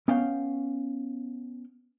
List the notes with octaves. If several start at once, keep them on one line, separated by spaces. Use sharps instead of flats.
B3 C#4 F5 G5